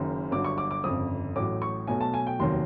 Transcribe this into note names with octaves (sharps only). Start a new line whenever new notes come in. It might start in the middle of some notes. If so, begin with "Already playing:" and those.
Already playing: F#1 F#2 D#3
G1 G2 D3 F#3 D6
C#6
D6
D6
G1 F2 C#3 D#6
A1 A2 F#3 A3 D6
C#6
B1 B2 F#3 A3 G#5
A5
G#5
G5
F1 D#2 D#3 F#3 C6